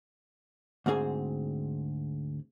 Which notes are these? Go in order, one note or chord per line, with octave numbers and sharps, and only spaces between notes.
D2 G#2 C4 G#4 G#5